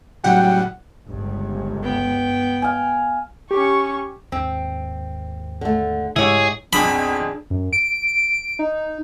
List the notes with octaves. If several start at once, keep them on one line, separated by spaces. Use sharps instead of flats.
A2 C#3 F#3 G3 F#5 G5
G1 C#2 G2
B3 G5
F5 G#5
C#4 G4 C#6
D#2 G#2 C4
D3 A3
G#2 C#3 G#3 A3 E4 G4 G#4 C#5
B1 F2 C4 D4 G#4 B5
F#2
D7
D#4